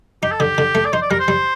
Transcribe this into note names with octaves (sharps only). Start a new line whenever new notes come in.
D#4 G4
A4
D3 G4
D3
A3
D5
D#4 C5
D5
G3 A#4
C5
G3